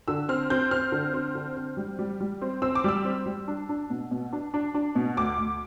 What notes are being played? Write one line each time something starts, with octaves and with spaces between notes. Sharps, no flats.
D3 E6
C4 F6
C4 G6
C4 F6
D3
C4
D3
C4
G3
G3
G3
C4
C4 E6
D6
G3 E6
C4
G3
D4
D4
B2
B2
D4
D4
D4
B2
D2 D6
D2